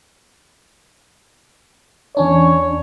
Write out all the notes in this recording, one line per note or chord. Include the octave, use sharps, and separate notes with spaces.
E2 C#4 D4 C#5